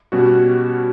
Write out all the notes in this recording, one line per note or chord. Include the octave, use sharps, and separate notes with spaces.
B2 G3 C#4 F#4